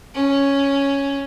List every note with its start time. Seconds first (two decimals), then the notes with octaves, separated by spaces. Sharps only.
0.14 C#4